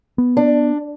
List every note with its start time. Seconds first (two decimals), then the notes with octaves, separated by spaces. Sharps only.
0.18 B3
0.37 D4